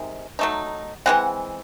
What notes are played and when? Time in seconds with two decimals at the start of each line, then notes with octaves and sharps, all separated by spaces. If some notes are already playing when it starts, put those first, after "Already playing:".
Already playing: C3 D#3 G#3
0.39 F#3 A3 D#4
1.06 E3 G#3 C4 F#5